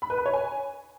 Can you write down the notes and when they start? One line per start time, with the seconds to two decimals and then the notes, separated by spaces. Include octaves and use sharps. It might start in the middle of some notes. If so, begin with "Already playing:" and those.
0.02 B5
0.10 B4
0.18 B5
0.26 C#5
0.33 G#5